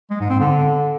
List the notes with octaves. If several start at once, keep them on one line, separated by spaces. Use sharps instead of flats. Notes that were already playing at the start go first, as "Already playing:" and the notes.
G#3
G#2
C4
D3